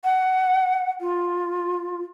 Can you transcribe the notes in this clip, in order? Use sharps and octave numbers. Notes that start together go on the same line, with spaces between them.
F#5
F4